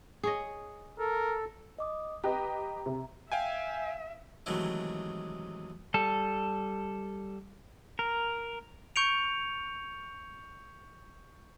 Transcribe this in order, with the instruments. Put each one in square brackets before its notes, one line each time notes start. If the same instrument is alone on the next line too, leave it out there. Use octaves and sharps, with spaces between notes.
[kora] G#4 C#5 D#5
[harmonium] A4 [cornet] A#4
[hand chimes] D#5 D6 D#6
[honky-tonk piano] G4 B4 D#5 [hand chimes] A#5
[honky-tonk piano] C3
[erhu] E5 [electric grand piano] F5 G5 G#5
[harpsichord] C3 D#3 E3 F#3 G#3 A3
[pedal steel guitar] G3 A4
A#4
[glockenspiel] C#6 G6 C#7 D7 F7